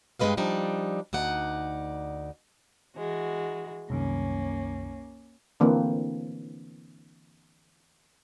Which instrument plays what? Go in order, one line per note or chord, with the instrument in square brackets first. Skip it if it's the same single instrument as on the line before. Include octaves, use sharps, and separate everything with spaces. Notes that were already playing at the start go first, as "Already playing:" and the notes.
[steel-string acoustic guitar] G2 G3 G#3 B4 D#5 F5
F3 G3 D4 D#4
D2 D#4 D5 F#5
[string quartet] E3 G#3 F#4
[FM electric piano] C2 F#2 D#3 [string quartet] A#3 C#4
[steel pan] D3 E3 A#3 C4 D4 B4